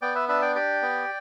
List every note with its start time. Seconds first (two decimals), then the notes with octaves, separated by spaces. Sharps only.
0.02 B3 D5 G5
0.15 B4 E5
0.28 D4 B4 E5
0.42 D5 G5
0.55 G4 D5 G5
0.82 B3